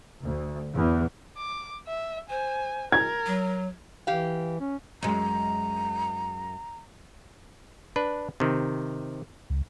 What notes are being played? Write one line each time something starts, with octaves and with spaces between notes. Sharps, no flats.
D2
E2
D6
E5
C5 G#5
A#4 G#6
F#3
E3 G4 F5
C#4
F#2 G#3 A#5
D4 B4
C3 D#3
C#2